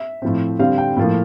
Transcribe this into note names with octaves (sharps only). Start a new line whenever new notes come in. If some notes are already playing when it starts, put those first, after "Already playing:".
Already playing: E5
A2 F3 C4
D3 G3 C4 F5
G5
A2 F3 A#3